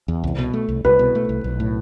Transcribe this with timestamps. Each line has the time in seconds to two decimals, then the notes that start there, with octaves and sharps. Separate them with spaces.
0.08 E2
0.24 C2
0.39 B2
0.53 A3
0.69 C2
0.84 C2 B4
0.99 B2
1.15 A3
1.29 C2
1.44 B1
1.60 A2